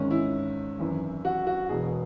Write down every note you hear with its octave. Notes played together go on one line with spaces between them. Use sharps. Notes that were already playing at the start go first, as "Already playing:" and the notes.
Already playing: G#1 G#2 D#3 C#4
E4
G#1 F#2 E3
F#4
F#4
E1 E2 B2 G#4